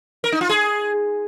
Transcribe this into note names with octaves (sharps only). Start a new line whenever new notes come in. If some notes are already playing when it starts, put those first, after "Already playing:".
A#4
D#4
F4
G#4